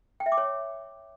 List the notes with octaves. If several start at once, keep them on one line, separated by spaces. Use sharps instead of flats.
G5
E5
D6
C#5